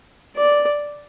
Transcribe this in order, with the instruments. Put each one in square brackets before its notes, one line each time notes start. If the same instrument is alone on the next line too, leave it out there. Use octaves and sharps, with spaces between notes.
[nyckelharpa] D5